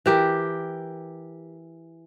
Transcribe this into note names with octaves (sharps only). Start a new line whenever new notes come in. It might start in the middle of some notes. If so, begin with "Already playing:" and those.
E3 G4 A#4